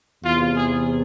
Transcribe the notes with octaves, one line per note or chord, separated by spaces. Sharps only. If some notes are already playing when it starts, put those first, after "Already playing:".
E2 C3 E3 F4
G#4